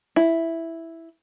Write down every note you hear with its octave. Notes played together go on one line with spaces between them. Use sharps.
E4